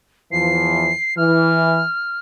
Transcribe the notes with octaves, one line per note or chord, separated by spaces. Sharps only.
E2 E3 F3 C7
E3 F6